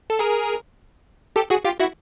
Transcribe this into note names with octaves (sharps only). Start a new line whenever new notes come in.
A4
G#4 A#4
G4 A4
F#4 G#4
F4 G4
E4 F#4